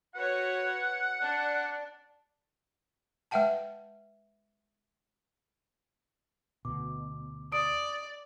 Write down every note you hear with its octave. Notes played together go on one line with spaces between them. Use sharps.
F#4 B4 C#5 F#5
D4 D5
G#3 B4 E5 F#5 G5 A5
D2 B2 D6
D5 D#6 D7